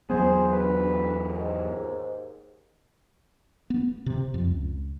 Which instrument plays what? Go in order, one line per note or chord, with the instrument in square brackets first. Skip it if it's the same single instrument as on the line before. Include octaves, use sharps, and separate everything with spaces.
[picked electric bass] E2 F#3 B3 [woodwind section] G#4 C5
[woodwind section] D2 B4
D#2 G#2
[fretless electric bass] B3
C3
F2
C#2